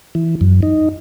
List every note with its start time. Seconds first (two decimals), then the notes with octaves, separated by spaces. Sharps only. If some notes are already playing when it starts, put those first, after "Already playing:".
0.15 E3
0.41 F#2
0.63 D#4